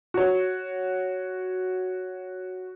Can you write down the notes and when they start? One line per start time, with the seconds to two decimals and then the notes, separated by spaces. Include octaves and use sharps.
0.14 F#4 C#5